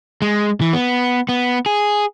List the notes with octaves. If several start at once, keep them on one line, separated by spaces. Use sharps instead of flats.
G#3
E3
B3
B3
G#4